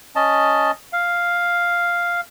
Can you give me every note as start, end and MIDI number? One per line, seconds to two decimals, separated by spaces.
0.15 0.71 61
0.15 0.71 75
0.15 0.71 81
0.93 2.21 77